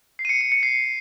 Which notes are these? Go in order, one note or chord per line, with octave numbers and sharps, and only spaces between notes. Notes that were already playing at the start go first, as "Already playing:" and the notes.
C7
D#7
C#7
D#7
C#7
C7